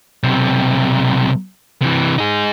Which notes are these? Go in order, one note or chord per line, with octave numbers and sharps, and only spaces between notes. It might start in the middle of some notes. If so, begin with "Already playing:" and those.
B1 C3
C3 E3
D#4 G#4